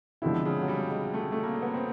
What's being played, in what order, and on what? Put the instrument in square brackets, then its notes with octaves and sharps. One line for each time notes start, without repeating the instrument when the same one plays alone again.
[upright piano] B2 [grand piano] D3 F3 G#3 C4 E4
[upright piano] C#3
F#3
G3
G#3
A3
A3
A#3
B3
C4